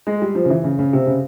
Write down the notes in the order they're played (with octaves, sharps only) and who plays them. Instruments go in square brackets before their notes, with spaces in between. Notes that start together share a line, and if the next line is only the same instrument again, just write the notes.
[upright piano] G#3
G3
F3
C#3
E3
C#3
C#3
C3
C#3